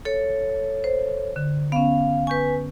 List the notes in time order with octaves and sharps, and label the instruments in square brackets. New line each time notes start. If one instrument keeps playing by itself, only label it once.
[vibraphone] A4 C#5
[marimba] C5
D3
[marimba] B3 C#4 [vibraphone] F5
[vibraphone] B4 G#5 [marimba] C#6 G6